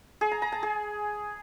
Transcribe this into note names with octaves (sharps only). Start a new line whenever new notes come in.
G#4
A#5
A#5
A5
G#4